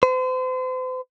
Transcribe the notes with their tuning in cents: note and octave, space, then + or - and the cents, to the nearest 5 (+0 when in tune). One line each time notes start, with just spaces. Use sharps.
C5 -40